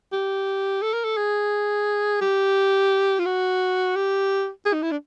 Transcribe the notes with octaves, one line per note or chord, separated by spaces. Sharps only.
G4
A4
A#4
A4
G#4
G4
F4
F#4
G4
G#4
D#4
E4
D4